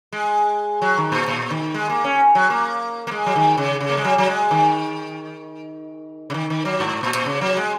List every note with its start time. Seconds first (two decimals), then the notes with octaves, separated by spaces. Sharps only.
0.12 G#3
0.82 F#3
0.98 D#3
1.12 A#2
1.28 A#2
1.50 D#3
1.74 G#3
1.89 A#3
2.04 C#4
2.35 F#3
2.50 A#3
3.07 A#3
3.11 G#3
3.26 F#3
3.36 D#3
3.57 C#3
3.80 C#3
3.89 A#3
3.97 G#3
4.04 F#3
4.18 F#3
4.28 G#3
4.51 D#3
6.30 C#3
6.34 D#3
6.50 D#3
6.65 F#3
6.80 G#2
7.03 A#2
7.15 A#2
7.26 C#3
7.41 F#3
7.57 G#3